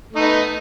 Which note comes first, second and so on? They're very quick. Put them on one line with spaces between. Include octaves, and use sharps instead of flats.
A3 D#4 B3